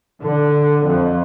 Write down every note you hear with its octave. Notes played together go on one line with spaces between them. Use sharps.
D3
F2